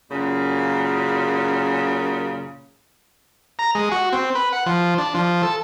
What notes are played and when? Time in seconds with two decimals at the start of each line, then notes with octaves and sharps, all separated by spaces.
0.11 F#2 A#2 C#3
3.59 A#5
3.75 G#3
3.92 F#4
4.13 C4
4.35 B4
4.53 F#5
4.66 F3
4.98 D4
5.14 F3
5.43 A4